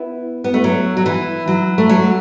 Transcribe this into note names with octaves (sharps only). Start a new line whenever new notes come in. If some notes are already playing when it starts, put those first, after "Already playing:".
Already playing: B3 E4
B3
A3
F#3
F#3
E3
F#3
A3
F#3